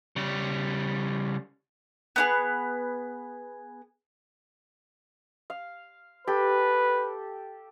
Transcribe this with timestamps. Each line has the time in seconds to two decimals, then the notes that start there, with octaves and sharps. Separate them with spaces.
0.16 C#3 G3
2.16 B3 D#4 G#4
5.50 F5
6.27 G4 A4 B4